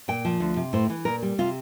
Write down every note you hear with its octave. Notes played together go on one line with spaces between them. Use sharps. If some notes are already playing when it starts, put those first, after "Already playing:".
A#2 G5
F3
D2
C3
A2 C5
E3
A#2 A#4
G3
C3 F4